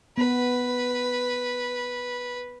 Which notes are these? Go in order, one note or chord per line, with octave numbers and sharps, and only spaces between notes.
B3 B4